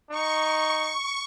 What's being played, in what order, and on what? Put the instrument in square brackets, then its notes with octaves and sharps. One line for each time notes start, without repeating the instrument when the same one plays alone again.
[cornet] D#4 [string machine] C#6